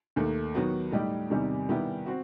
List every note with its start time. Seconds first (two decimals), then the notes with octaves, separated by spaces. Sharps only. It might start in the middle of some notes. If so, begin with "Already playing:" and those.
0.16 D#2 D#3 A3
0.54 D#3 F#3 B3 F#4
0.92 A2 G3 D#4 G4
1.30 E2 C3 D#3 G3 D#4
1.69 D#3 G3 B3 E4 G4
2.06 C4 F#4